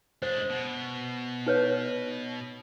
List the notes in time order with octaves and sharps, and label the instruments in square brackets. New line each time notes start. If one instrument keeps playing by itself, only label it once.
[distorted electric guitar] G#3 D4 [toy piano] C5
[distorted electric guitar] B2
[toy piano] D#4 B4 C#5